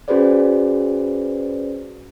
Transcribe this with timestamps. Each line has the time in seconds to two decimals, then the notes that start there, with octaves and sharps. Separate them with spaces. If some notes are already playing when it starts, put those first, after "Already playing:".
0.08 C#4 F#4 G#4 B4 C5 D5